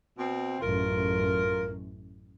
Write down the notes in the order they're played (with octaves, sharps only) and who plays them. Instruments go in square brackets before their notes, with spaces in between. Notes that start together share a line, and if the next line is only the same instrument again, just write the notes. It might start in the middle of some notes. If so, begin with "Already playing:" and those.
[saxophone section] B2 C4
[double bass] A1 F#2 [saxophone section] F4 A#4